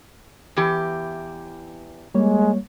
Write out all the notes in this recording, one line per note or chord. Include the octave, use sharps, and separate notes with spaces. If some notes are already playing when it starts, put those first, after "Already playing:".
E2 E3 G4
G3 G#3 A#3 C#5